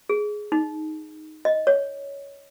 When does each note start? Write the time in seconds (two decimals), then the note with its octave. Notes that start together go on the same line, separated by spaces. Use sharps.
0.09 G#4
0.52 D#4
1.45 D#5
1.67 C#5